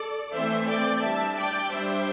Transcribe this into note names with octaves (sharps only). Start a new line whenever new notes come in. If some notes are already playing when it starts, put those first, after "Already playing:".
Already playing: A4 D5
E3 A3 C4 C5 E5
D5 G5
G3 D4 E5 A5
D5 G5
G3 D4 C5 E5